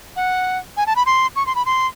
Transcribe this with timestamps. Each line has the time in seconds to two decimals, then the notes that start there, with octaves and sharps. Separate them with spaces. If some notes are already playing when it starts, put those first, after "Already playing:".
0.16 F#5
0.77 G#5
0.87 A5
0.96 B5
1.06 C6
1.36 C#6
1.47 C6
1.55 B5
1.66 C6